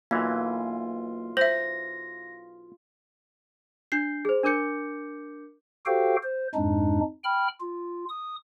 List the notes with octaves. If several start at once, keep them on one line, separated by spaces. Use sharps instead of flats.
B1 E3 A#3 F4
C5 E5 A#6
D4 G6 C7
G#4 C5
D4 A#4 D6 G6 C#7
F#4 G4 A4 C5 F5 G5
C5
F2 G#2 G#3 D4 D#4
G5 B5 F6
F4
D#6